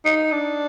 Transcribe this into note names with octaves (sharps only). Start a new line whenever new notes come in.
D#4
D4